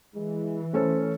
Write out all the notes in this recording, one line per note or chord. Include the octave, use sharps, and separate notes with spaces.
E3 G#3
A3 C#4 A4 C5